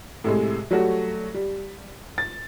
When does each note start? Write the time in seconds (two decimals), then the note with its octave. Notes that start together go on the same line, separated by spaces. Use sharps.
0.24 A2 C3 G#3
0.71 F#3 G3 A3 F#4
1.34 G3
2.18 A6